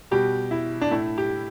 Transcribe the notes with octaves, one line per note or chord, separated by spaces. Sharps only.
B2 G3 G4
E4
D4
A2 A3 E4
G4